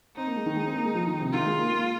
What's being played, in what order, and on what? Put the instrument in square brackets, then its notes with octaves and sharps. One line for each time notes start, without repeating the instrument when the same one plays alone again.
[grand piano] C4 [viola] D#4
[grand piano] A#3
G#3
D#3
G#3
C4
A#3
G#3
F3
D#3
C3
[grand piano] D#3 [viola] F4
[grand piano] G#3
A#3
A#3